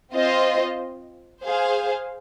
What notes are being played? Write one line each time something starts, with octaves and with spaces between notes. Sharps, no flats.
C4 F4 C5 D#5
G#4 C5 F5